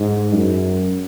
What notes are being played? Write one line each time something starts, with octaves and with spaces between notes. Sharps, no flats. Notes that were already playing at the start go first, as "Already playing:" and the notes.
Already playing: G#2
F#2